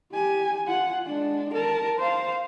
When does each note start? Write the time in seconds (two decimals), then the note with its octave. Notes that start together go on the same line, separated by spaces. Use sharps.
0.12 G4 G#5
0.66 F4 F#5
1.06 G#3 D4
1.54 A#4 A5
1.99 C5 F5